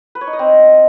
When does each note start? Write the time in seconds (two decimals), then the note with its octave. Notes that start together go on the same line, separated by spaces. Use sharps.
0.15 B4
0.21 C#5
0.27 D#4
0.33 D#5
0.39 C4